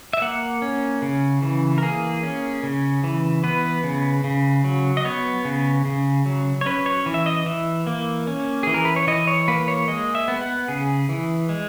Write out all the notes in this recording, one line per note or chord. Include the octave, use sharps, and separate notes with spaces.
E5
A#3 F#5
C#4
C#3
E3
A#4
A#3 G#4
C#4
C#3
E3
B3 B4
C#3
C#3
F#3
D#5
B3 C#5
C#3
C#3
F#3
C#5
C#4 B4
C#5
E3
E5
D#5
E3 E5
A#3
C#4
E3 G#4
A#4
B4
C#5
E3 D#5
C#5
A#3 B4
C#5
G#3 D#5
E5
B3
F#5
C#3 G#4
E3
G#3